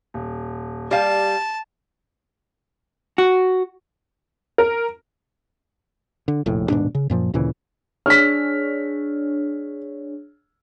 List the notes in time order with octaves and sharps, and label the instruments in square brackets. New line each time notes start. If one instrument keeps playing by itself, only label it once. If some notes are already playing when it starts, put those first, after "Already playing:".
[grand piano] D#1
[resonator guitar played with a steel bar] G3 F5 [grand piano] G4 [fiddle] A5
[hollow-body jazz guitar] F#4
[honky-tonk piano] A#4
[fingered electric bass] D3
F1 A#1 A2
D#1 G#2 B2 D4
C#3
F#2 A#2 F3
D2 A#2 C#3 E3
[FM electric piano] D4 G#4 C#5 [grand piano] F6 B6